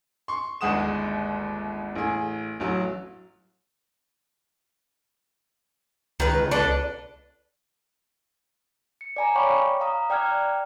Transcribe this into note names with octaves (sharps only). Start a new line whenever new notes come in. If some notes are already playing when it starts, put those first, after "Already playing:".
C6 C#6
G1 D#2 G#3 F#5 D#6 E7
A1 G#4
A1 F#3
C#2 D#3 B4
D4 A4 B4
C#7
D5 G#5 A#5
C#5 F5 G5 B5 C#6 D6
F5 A#5 D#6
D5 G5 A#5 F6 F#6 G#6